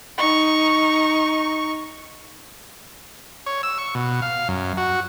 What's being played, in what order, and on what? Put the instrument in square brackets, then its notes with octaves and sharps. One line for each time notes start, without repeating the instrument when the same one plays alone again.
[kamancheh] D#4 C#6
[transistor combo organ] C#5
E6
C#6
B2
F5
F#2
F#4